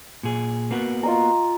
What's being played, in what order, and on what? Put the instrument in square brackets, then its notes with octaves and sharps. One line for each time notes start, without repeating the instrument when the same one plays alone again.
[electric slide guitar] A#2 G#4
A#3 B3 F#4
[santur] F4 D#5 A#5